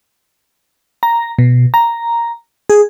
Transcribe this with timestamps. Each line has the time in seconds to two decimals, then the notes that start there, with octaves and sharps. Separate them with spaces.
1.03 A#5
1.39 B2
1.74 A#5
2.70 G#4